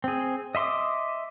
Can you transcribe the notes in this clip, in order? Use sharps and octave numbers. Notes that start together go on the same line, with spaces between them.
C4 G#4
D#5 E5 C6 D6 D#6